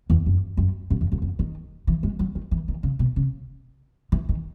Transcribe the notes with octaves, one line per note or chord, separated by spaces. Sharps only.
E2
F#2
F#2
F#2
E2
F#2
F#2
D#3
E3
G#3
F#3
D#3
E3
D#3
C#3
B2
C#3
E3
D#3